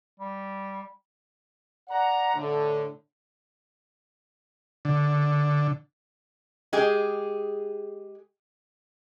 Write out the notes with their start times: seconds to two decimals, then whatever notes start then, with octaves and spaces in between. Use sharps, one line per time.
0.20 G3
1.88 D5 F#5 A#5
2.35 A2 D3
4.85 D3
6.73 G#3 G4 G#4